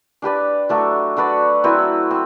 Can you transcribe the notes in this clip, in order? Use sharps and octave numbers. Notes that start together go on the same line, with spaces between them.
D4 G4 B4 D5
F#3 A3 D4 F#4
D4 F#4 B4 D5
F#3 C4 E4 B4
C4